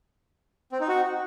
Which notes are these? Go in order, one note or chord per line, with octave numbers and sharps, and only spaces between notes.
C4
D#4
F#4